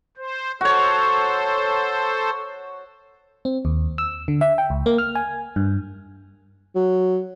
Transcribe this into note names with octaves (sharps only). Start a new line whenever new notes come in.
C5
F#4 A4 C5 C#5
C4
D#2
E6
D3
E5
G5
C#2
A#3
F6
G#5
G2
F#3